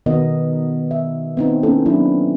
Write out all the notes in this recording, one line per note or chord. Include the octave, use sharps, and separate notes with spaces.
B2 D#3 B3 A#4 D#5
E5
B3 C4 D#4
A#3 C#4 E4 A4
F#3 B3 C4 D4 E4